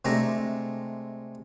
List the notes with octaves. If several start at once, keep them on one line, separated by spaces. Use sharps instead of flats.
C3 G#3 A3 D4 A#5